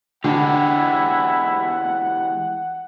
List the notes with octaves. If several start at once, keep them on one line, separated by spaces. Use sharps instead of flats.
D3 E3 G#3 E4 G4 F#5